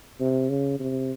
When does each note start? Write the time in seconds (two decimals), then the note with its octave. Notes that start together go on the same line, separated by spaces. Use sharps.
0.20 C3
0.50 C#3
0.80 C3